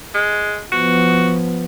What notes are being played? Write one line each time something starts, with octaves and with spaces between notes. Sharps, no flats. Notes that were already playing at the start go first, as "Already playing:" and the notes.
G#3
F3 B3 F#4